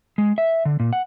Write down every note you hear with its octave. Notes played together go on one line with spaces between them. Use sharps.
G#3
E5
D3
A#2
F#5